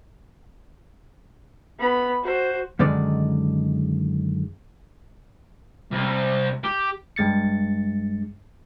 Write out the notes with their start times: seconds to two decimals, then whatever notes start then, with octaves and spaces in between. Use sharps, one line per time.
1.79 B3 B5
2.23 F#4 C5
2.79 F#2 D3 D#3 G#3 D5
5.91 C2
6.64 G4
7.16 G2 G#3 A6 C#7